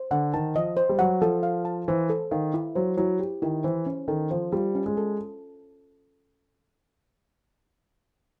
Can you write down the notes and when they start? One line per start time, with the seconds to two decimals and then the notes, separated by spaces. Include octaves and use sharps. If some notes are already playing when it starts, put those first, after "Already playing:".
Already playing: C5
0.11 D3 F#5
0.34 D#3 A5
0.55 F3 D#5
0.77 C5
0.89 G3
0.99 F#3 F#5
1.21 F3 A4
1.43 F5
1.65 A5
1.88 E3 C5
2.10 A4
2.31 D#3 F5
2.54 E4
2.75 F#3 C5
2.97 F#3 E4
3.19 G4
3.42 D#3 E4
3.64 E3 C5
3.86 C#4
4.08 D#3 A4
4.31 F3 C5
4.52 G3 F4
4.75 C#4
4.86 G#3
4.97 A4